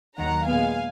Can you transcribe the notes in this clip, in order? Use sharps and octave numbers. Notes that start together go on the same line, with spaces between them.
D#2 D#3 F#3 F#5 A#5
A#2 G#3 B3 F5 G#5